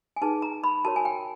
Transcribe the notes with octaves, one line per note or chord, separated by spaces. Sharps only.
G#5
D#4 G#4 B4 A5
A#5
B5
F#4 A#4 C#5 A5
G#5
G5